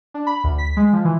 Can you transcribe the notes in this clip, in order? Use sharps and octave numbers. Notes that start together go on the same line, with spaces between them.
D4
B5
D2
B6
G#3
F3
E3